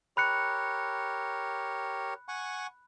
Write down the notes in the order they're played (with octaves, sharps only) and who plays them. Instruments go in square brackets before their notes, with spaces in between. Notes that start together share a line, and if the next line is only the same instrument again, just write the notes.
[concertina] G4 A#4 C#5 [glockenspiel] B5 F#6 C#7
[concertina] F#5 G#5 C#6